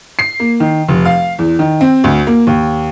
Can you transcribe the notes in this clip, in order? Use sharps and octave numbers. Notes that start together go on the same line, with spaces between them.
C7
A#3
D#3
F1
F5
E2
D#3
C4
D2
A#3
D#2